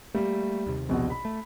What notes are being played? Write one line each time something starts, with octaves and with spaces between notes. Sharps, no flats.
G3 A3 A#3
D#2 C3
A#1 B2 F#4
B5
A3